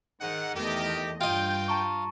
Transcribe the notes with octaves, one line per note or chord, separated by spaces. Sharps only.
G#2 D#3 D#4 F#5
E2 D#3 A3 G4 D#5
G2 F4 D#5 G5
A5 A#5 C#6